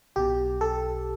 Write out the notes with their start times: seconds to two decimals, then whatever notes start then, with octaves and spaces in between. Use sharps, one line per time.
0.16 B1 B2 G4
0.61 A4